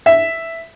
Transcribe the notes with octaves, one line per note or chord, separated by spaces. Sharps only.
E5